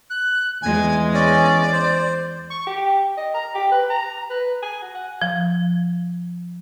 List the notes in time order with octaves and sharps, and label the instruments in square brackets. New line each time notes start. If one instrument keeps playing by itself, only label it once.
[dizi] F#6
[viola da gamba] E2 G#3 [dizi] G#5
[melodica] C#4 [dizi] D5
[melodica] C5
[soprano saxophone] C#6
G4
D#5
A#5
G4
B4
A#5
B4
G#5
F#4
F#5
[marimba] F3